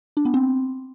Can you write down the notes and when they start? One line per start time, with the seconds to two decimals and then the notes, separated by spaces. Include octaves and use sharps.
0.17 D4
0.25 B3
0.34 C4